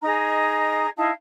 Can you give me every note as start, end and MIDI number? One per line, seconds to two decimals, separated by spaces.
0.02 0.87 63
0.02 0.87 68
0.02 0.87 75
0.02 0.87 82
0.96 1.10 63
0.96 1.10 64
0.96 1.10 77
0.96 1.10 81